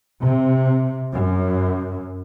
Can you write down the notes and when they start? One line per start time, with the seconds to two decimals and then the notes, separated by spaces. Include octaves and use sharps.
0.21 C3
1.11 F#2